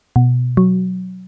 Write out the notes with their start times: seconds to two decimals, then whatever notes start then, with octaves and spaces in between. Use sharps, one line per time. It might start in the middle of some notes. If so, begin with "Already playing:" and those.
0.16 B2
0.57 F#3